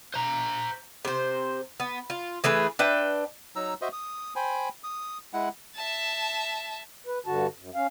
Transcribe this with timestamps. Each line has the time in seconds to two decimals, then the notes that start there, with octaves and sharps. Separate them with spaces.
0.14 C5 A#5
1.05 C3 C5
1.80 B3
2.10 F4
2.44 E3 A3 G#4 B4
2.79 D4 B4 E5 G5
3.56 F#3 D#4 A#5 E6
3.81 F#4 C5 D#5 E5
3.93 D#6
4.36 C5 G5 G#5 B5
4.84 D#6
5.33 G#3 E4 F#5
5.75 E5 A5
7.06 B4
7.26 G2 D3 F#4 A5
7.58 F#2
7.75 C#4 F5